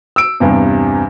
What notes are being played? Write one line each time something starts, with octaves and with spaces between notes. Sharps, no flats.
E6 D7
E2 G2 C3